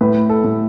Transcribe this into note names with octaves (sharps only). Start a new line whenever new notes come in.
A2 B4
A4
A2